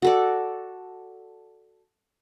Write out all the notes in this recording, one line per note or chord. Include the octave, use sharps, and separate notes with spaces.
F#4 A4 D5